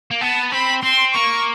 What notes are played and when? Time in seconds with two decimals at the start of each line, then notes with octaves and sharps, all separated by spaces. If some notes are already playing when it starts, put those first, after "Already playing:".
0.11 A#3
0.21 B3 A5
0.52 C4 B5
0.83 C4 C6
1.14 A#3 C#6